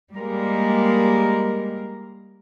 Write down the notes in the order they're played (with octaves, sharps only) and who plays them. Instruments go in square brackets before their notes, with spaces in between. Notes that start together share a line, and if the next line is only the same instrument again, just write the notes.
[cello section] G3 G#3 A#3 A#4